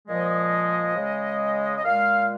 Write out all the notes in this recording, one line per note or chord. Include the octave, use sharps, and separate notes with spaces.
A#2 F3 G#3 D#5
C#3 G#3
D#5
A#2 G#3 F5